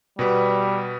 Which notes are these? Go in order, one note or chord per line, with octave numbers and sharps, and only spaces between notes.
B2 G3 B3 B4